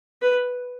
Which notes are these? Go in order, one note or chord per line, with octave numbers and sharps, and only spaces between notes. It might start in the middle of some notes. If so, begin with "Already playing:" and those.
B4